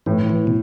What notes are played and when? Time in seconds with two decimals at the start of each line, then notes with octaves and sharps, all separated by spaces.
0.06 A2 E3
0.29 E3
0.47 B2